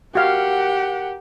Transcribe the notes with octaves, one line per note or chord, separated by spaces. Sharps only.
F#4 G4 A#4 F5 F#5